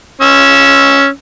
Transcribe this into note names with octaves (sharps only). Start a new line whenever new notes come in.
C#4 E6